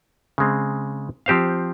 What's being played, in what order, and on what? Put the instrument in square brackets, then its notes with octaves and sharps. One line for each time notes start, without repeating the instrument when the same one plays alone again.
[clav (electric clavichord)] C#3 G#3 C4
F3 C4 G4 C5 F5